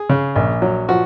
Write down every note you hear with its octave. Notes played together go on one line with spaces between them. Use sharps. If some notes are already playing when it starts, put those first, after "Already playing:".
Already playing: G#4
C#3
A#1
F#3
F3 F#4